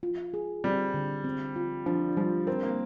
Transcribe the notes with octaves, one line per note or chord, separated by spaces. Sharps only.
F4
G#4
G3 C4
D3
C4
F4
F3 D4
F3 G3
C4 A#4
A#3